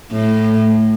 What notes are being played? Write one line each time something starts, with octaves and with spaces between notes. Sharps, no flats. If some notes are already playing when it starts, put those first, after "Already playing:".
A2